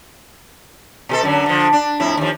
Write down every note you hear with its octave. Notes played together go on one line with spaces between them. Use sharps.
B2 G4 A4
F#2 D3 F#3
D3 F3
D4
F2 A2 E4
D#2 F3